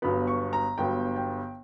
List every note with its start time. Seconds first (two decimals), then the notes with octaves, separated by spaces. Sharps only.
0.02 G1 G2 F#3 B3 B5
0.27 C#6
0.53 A#5
0.78 G1 G2 F#3 B3 G5
1.16 G5